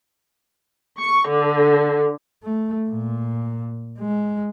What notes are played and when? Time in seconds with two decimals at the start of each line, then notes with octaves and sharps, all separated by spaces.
0.99 C#6
1.28 D3
2.43 A3
2.89 A#2
3.98 G#3